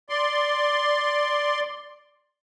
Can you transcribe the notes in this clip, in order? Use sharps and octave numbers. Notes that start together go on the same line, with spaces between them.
D5 C6